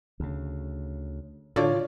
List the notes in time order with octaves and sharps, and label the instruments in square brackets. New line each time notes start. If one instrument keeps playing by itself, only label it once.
[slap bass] D2 C#3
[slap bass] A2 [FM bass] D3 [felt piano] F4 C#5 D5